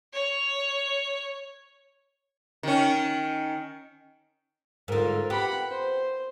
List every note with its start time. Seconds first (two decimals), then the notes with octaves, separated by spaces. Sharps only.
0.13 C#5
2.63 D#3 C#4
4.88 G#2 D3 F4 A#4
5.30 B3 G4 F#5 B5
5.70 C5